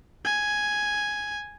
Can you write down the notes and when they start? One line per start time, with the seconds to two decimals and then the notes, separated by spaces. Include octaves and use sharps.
0.25 G#5